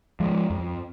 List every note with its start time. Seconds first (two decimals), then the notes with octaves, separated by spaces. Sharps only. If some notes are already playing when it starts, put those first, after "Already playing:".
0.20 F3 G#3
0.50 F2